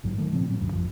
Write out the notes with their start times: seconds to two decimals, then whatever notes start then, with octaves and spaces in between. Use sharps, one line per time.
0.03 A#1 G#2 F#3
0.18 D#3 A3
0.32 A#2 C#3 F3 C4
0.49 A2 F#3 C#4
0.61 D2 G2
0.73 D#1 A1 F2 F3